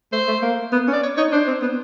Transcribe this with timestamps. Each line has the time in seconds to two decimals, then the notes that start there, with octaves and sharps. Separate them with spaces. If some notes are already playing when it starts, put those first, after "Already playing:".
0.12 A3 C5
0.28 A3
0.42 A#3
0.72 B3
0.88 C#4
0.93 D5
1.03 C#5
1.17 D#4 C#5
1.32 D4 C5
1.47 C4
1.62 B3